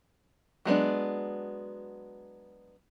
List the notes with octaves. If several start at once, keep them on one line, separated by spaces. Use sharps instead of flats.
F#3 G#3 B3 D4